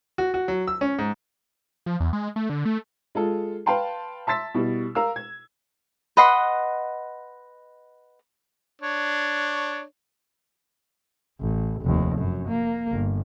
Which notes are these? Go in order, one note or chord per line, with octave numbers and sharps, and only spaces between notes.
F#4
F#4
F#3
E6
C#4
G#2
F3
E2
G#3
A3
D3
A3
G#3 F4 A4
B4 F5 G5 A5 C6
E5 A5 C6 E6 A6 B6
B2 G3 E4
A#4 F5 E6
G#6
B4 D#5 F#5 C6
D4 C#5
A1
F1 D#2
F#2
A#3
G1